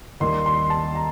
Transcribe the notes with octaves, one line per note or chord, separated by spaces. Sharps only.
D#2 D#3 G3 A#3 C6
C6
A5
A#5